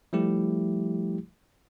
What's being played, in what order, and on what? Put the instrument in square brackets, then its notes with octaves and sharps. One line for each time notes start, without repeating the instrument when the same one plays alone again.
[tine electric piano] F3 G3 A3 E4 G4